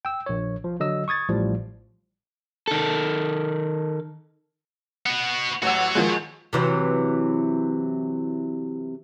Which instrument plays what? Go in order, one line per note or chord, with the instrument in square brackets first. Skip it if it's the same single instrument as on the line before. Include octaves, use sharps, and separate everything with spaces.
[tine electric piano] G5 E6
A#1 C#5
F3
D3 F#3 D#5 E6
C#6 D#6 G#6 A6
A1 A2 F3 G3
[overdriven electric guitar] D#3 A4
[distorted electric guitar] B3 F#4
[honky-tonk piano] A1 F#5 E6 [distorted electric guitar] F#4 C#5
[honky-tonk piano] D#3 F3 G#3
[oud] C3 E3 F#3